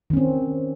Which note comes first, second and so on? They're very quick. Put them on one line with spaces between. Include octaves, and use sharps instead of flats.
D#3 C#4 C4